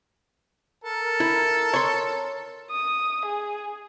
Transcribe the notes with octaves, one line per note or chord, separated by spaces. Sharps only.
A4 A#4
E4
C#5 C6
D#6
G#4